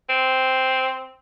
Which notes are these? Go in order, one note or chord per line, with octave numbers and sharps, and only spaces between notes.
C4